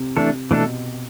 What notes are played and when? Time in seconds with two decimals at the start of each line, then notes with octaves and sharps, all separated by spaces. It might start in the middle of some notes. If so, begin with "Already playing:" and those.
Already playing: C3
0.17 E3 A3 D4 A4
0.50 B2 E3 A3 D4 A4